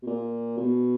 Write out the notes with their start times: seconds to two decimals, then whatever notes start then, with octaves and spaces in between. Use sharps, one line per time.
0.02 B2
0.07 A#2
0.57 B2